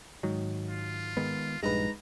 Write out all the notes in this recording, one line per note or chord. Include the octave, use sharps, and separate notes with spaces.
G#2 D#3 F#3
F4
D#3 G#3 B3
A#1 G2 G#3 D#4 B4 A#5